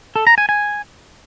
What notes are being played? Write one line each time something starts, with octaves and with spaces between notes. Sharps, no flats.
A4
A#5
G#5
G#5